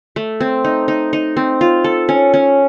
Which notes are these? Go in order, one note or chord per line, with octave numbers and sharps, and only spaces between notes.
A3
C4
D#4
D#4
D#4
C4
F4
A4
C#4
C#4